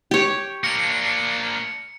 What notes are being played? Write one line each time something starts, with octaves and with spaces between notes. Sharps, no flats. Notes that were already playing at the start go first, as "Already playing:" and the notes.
G4 C#5
A#3 D4 C#7